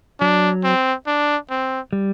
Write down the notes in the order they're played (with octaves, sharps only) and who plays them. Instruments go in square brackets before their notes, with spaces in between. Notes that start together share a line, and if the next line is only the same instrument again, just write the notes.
[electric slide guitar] F#3 [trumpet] D4
[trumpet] C4
D4
C4
[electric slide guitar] G3